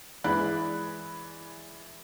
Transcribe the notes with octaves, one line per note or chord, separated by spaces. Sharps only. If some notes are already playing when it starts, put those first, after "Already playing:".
E3 G#3 D5 B5 F#6